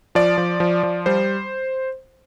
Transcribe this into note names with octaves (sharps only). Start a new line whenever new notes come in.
F3 D5
F3
F3
F3
G3 C5